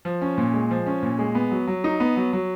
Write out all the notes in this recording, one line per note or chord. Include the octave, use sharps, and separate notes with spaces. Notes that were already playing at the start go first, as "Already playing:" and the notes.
F3
C#4
A#2
G#3
F3
C#4
A#2
G#3
B3
F#3
F#3
D#4
B3
F#3
F#3